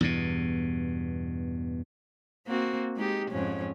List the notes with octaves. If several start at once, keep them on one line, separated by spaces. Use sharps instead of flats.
E2 G2 B2
A#3 C4 F#4
G#3 D#4 G4
F2 G#2 C#4